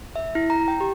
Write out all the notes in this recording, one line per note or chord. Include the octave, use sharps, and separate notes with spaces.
E5
E4
A#5
G5
G4